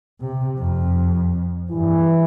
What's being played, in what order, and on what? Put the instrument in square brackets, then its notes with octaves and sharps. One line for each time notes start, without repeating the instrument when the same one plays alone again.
[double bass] C3
F2
[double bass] G2 [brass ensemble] E3